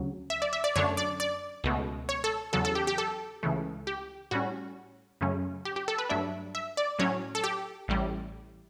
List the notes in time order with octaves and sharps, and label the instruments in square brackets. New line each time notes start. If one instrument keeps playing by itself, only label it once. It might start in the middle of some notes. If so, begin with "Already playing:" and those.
Already playing: [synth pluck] D2 C#3 F#3 C#4
E5
D5
E5
D5
F#2 D3 A3 D4 C#5
D5
D5
C#2 B2 A3
C#5
A4
E2 C#3 F#3 A4
A4
G4
G4
A4
C#2 C#3 E3 A3
G4
A2 G3 C#4 F#4
F#2 C#3 F#3 A3 C#4
G4
G4
A4
B4
G2 F#3 A3 D4 E5
E5
D5
A2 F#3 C#4 C#5
A4
G4
A1 A2 G3